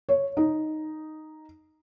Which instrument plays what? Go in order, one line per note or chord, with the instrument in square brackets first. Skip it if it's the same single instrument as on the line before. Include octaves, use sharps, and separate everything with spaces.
[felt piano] C#5
D#4